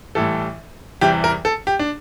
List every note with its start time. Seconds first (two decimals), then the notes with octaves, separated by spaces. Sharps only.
0.15 A1 A2 E3 G3 A4
1.01 E2 C3 E3 G3 G4
1.24 A#4
1.45 A4
1.67 G4
1.79 D4